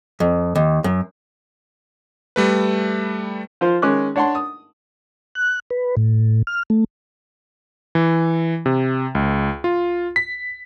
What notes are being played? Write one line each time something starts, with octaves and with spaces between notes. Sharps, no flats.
F2
D#2
F#2
G3 A3 B4
F3 F4 C5
D#3 G#3 C#4 D6 F#6
D4 C#5 F#5 A5 C6
D#6
F#6
B4
A2
F6
A3
E3
C3
C#2
F4
B6